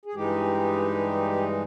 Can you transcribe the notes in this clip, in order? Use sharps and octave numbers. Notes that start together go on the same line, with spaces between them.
G#4
G2 E3 G#3 D#4 G4